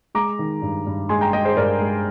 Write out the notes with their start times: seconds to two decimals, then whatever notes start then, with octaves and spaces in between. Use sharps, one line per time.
0.15 G#3 A#5 D6
0.39 D#3
0.62 G2
0.86 G2
1.09 G#3 G#5 C6
1.21 G5 A#5
1.33 G#3 D#5 G5
1.45 G#4 C5
1.57 G2 A#4 D5
1.80 G#3